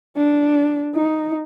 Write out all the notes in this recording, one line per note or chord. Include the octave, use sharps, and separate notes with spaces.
D4
D#4